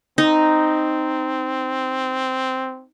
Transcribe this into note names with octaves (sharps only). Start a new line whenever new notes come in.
C4 D#4